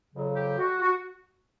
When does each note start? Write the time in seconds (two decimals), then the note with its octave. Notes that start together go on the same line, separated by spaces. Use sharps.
0.14 F2 C#3 F#3
0.36 G4
0.58 F#4
0.81 F#4